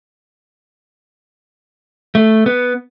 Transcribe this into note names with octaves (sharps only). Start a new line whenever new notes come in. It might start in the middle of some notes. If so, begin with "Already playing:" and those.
A3
B3